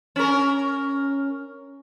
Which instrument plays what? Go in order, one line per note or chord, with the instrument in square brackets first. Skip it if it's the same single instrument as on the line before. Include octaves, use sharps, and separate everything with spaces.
[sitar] C#4 A#4